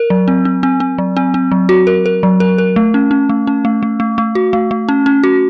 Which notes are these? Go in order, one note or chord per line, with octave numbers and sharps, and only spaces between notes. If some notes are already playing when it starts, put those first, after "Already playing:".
Already playing: A#4
F#3
C4
C4
C4
C4
F#3
C4
C4
F#3
F#4
A#4
A#4
F#3
A#4
A#4
A3
C#4
C#4
A3
C#4
A3
A3
A3
A3
F#4
A3
A3
C#4
C#4
F#4